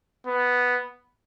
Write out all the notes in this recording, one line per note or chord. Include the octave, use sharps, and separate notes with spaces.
B3